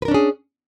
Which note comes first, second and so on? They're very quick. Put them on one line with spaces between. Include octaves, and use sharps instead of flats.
B4 A#4 D4 C#4 G#4